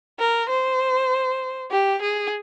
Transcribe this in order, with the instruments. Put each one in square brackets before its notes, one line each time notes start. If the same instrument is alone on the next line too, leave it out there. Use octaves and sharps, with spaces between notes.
[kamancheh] A#4
C5
G4
G#4